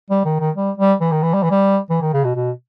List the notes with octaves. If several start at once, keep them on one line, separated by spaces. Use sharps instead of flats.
G3
D#3
D#3
G3
G3
E3
D#3
E3
G3
E3
G3
E3
D#3
C#3
B2
B2